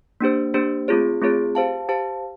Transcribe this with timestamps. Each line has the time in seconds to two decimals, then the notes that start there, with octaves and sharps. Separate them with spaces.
0.21 A#3 D4 G4 C5
0.54 A#3 D4 G4 C5
0.88 A3 C4 F4 G#4 C#5
1.21 A3 C4 F4 G#4 C#5
1.55 G4 C5 F5 A5
1.89 G4 C5 F5 A5